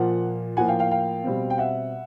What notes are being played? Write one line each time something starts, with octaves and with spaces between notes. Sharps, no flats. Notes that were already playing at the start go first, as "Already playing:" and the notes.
Already playing: A#2 F3 A#3 F#5
A2 F3 A#3 F#5 G#5
F5 G5
F5 G5
F5 G5
B2 G3 C4
G5
E5 F#5